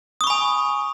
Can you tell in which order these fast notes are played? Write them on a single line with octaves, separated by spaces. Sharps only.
D#6 C#6 B5 G#5